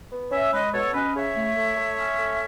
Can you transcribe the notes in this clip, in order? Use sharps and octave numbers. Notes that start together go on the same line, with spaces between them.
B3
C#4 C#5 E5
G#3 B4 D#5
B2 A4 C#5
C#4 B4 D#5
C#3 C#5 E5
A3
A3
A3
C#4
A3